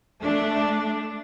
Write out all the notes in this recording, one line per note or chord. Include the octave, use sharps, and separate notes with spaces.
A3 D4